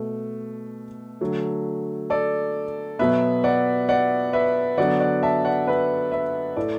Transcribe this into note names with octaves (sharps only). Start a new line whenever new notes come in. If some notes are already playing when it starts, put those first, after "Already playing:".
Already playing: B2 A3
D3 F#3 A3
A4 D5
B2 F#3 B3 B4 E5
D5 F#5
D5 F#5
B4 E5
D3 F#3 B3 D5 F#5
D5 F#5
E5 A5
D5 F#5
B4 E5
B4 E5
A2 A3 A4 D5